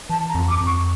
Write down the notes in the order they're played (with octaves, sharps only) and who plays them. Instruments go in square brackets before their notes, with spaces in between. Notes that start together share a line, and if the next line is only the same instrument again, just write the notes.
[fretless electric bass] E3 [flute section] A5
[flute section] A#5
[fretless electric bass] F2
[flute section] D6
[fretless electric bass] F2
[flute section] C#6